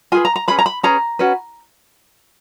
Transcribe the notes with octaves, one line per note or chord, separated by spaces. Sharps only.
F4 G#4 B4 G#5
A#5
A#5
C#4 G#4 B4 B5
A#5
B5
C#4 G#4 B4 A#5
C#4 F#4 B4